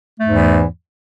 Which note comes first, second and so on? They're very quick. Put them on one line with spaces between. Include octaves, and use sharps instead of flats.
A3 G#2 E2 E3